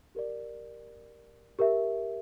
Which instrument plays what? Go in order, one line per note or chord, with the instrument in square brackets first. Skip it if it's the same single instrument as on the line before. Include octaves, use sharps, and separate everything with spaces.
[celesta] G4 A#4 D5
G4 A#4 E5